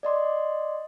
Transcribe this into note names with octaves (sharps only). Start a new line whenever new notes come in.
D5 D#5 C6 D6